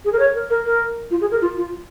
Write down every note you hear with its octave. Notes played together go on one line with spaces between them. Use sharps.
G#4
A#4
C#5
A#4
A#4
A#4
F4
G#4
A#4
F4
F4